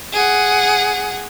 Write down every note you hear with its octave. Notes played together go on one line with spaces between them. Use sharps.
G#4 F#5